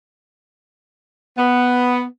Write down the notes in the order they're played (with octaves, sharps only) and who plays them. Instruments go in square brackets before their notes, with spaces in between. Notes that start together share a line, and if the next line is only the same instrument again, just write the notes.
[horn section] B3